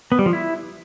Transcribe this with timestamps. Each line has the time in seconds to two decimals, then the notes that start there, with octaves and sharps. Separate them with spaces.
0.12 B3
0.19 G3
0.26 F3
0.33 E4